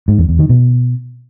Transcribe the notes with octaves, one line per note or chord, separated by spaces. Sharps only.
G#2
E2
E2
D#3
B2